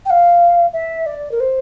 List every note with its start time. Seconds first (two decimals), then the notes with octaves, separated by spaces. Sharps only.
0.06 G5
0.10 F5
0.73 E5
1.06 D5
1.32 A#4
1.40 C5